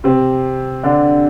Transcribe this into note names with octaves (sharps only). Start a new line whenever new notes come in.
C3 C4
D3 D4